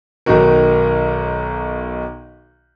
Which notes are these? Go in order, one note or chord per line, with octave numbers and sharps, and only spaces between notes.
B1 D#3 D#4 F#4 A#4